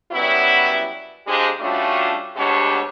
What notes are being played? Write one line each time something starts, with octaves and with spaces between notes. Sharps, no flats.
F#2 F#3 G3 B3 E4
F2 G#3 C4 D4 G4 G#4
G3 A3 C#4 D4 F4 F#4
D2 B2 G#3 D4 G4 C#5